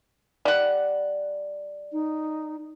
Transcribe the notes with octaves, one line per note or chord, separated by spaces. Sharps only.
G3 D5 F#5
D#4